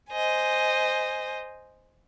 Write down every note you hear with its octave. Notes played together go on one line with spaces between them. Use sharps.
C5 D#5 G#5